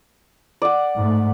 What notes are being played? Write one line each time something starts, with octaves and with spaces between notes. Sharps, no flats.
D5 F#5
G#2 A3